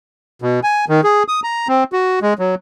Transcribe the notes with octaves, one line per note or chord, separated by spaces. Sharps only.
B2
G#5
D#3
G#4
D#6
A#5
C4
F#4
G#3
F#3